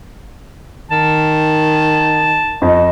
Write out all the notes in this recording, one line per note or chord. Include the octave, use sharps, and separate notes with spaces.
D#3 A5
F2 D#5